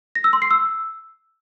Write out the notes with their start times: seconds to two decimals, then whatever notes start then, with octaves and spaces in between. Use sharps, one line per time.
0.15 A#6
0.24 E6
0.33 C6
0.42 C7
0.51 E6